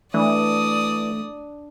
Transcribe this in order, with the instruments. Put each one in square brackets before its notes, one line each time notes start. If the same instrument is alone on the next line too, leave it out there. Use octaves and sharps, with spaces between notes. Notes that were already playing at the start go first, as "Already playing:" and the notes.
[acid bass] E3 [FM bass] A3 [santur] D4 [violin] D5 D#6